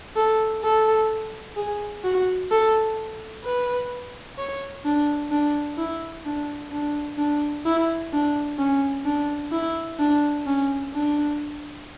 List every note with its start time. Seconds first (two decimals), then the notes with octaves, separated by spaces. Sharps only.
0.16 A4
0.63 A4
1.56 G#4
2.04 F#4
2.51 A4
3.44 B4
4.38 C#5
4.85 D4
5.31 D4
5.78 E4
6.25 D4
6.72 D4
7.18 D4
7.66 E4
8.13 D4
8.59 C#4
9.05 D4
9.52 E4
9.99 D4
10.47 C#4
10.93 D4